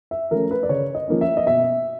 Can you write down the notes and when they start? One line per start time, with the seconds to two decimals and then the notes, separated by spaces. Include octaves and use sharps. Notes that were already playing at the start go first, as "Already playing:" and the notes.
0.11 E5
0.31 F3 A3 C#4 A#4
0.51 B4
0.63 D5
0.69 C#3 C#5
0.95 D#5
1.08 F3 A#3 C#4
1.21 E5
1.37 D#5
1.46 B2 E5